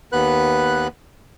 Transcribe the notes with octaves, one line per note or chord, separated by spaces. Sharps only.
D#2 B3 B4 F#6